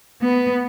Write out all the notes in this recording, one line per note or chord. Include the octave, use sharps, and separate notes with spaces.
B3